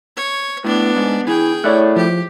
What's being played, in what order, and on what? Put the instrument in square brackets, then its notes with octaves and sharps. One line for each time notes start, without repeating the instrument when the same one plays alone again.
[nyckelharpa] C#5
[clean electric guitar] A2 [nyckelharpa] B3 D4
[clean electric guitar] G#2
[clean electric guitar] E3 [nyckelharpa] G#4 G5
[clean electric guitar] A3 E4 [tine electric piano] C#5 D5 F#6
[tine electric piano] F3 [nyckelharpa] G4